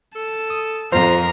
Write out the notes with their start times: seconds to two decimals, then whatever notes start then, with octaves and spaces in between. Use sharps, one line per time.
0.15 A4 A5
0.50 D#6
0.92 F2 F4 A#4 C5 A#5